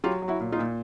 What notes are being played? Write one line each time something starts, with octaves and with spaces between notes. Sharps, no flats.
F#3 F4 G4
F#3
E4 F#4
A#2
D#4 F4
A#2